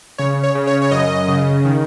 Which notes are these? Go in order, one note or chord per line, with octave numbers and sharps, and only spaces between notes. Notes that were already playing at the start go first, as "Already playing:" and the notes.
C#3 C#5
C#5
C#3
C#5
C#5
F#2 D#5
C#3
D#3